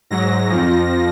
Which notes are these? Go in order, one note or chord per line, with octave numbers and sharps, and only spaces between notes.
G#2 F#3 A#6
F2 F3